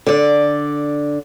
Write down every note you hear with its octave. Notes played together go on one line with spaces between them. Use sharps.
D3 D5